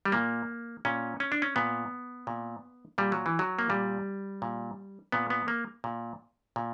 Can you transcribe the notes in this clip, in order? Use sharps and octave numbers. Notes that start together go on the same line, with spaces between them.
G3
A#2 A#3
A#2 C#4
C#4
D4
C#4
A#2 B3
A#2
A#2 G3
F#3
E3
F#3
A#3
A#2 G3
A#2
A#2 B3
B3
A#3
A#2
A#2